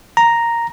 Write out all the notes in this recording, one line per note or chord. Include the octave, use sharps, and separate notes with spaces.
A#5